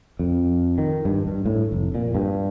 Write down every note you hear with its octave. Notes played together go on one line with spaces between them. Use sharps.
F2
D#3
G2
G2
A2
F1
A#2
G2